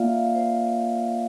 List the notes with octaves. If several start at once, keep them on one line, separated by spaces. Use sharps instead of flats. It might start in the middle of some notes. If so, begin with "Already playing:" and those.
Already playing: A#3 F4 D5 E5 F5
F5
C5